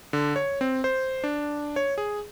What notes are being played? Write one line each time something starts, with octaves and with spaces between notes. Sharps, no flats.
D3
C#5
C4
C5
D4
C#5
G#4